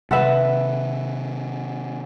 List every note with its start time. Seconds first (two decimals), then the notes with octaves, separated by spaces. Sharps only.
0.11 C3 D#3 A4 B4 E5 F#5